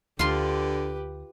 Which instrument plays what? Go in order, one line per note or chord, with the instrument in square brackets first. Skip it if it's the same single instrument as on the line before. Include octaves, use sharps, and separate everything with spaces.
[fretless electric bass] D2 [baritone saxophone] D3 [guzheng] F4 C6 [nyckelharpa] G4 B4